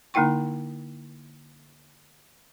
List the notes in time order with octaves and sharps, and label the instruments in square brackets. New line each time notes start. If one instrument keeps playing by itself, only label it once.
[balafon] D3 A#3 D#4 E4 G5 C#6